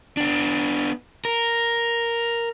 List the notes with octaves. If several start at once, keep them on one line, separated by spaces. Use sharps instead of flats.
B3 D4
A#4